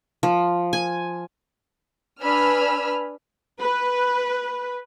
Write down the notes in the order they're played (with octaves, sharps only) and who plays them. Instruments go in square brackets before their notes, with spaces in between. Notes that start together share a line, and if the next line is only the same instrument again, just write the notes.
[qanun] F3
G#5
[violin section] D4 B4 G#5 B5 E6 F6
[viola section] B4